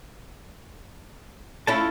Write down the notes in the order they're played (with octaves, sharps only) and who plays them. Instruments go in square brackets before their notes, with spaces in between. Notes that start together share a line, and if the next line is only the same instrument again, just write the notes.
[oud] A3 C#4 E4 [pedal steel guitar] F4 A5